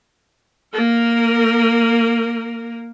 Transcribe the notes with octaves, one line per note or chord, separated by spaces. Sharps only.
A#3 A#4